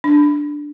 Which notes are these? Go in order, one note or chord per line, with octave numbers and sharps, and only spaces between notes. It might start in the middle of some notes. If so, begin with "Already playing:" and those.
D4